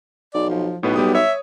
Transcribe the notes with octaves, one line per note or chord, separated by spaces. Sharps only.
B1 D5
F3
B1 A2 B3 B4
G3 B3 G4 D#6
C#5 E5